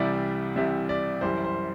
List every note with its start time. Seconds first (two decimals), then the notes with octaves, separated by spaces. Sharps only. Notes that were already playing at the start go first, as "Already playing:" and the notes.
Already playing: C2 C3 E3 G3 D5
0.56 C2 C3 E3 G3 E5
0.89 D5
1.21 F#2 E3 G3 C5
1.44 C5